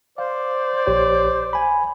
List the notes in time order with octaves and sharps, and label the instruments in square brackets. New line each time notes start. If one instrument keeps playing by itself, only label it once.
[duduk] C5 [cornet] D5 [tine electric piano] F5
[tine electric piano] A#1 G4 C#5
G#5 B5